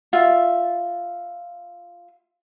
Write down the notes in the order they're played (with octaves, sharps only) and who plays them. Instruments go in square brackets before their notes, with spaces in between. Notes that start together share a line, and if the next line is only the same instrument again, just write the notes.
[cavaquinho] F4 E5